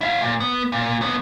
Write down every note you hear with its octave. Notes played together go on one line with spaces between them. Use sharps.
E4 F5
A#2
B3
A#2
D#2 B3